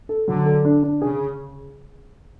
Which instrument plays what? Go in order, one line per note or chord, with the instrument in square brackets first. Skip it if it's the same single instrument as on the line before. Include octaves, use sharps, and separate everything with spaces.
[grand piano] A4
[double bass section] D3 [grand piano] F#3
[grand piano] A4
D4
D4
[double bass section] C#3 [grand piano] G#4